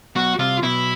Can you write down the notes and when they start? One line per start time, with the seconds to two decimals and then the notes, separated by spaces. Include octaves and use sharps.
0.16 B1 B2 F#4
0.39 C2 C3 F4
0.63 B1 B2 E4